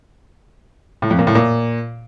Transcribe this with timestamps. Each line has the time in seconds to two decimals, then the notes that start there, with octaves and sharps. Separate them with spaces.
1.02 A2
1.11 F2
1.19 A#2
1.27 A2
1.35 A#2